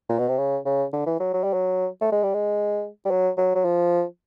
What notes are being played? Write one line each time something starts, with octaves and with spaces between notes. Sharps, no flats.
A#2
B2
C3
C#3
C#3
D3
E3
F#3
F#3
G3
F#3
A3
G#3
G3
G#3
G3
F#3
F#3
F#3
F3